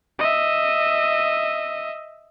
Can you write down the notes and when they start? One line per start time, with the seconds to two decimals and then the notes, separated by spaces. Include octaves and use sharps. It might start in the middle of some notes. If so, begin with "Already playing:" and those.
0.19 D#5 E5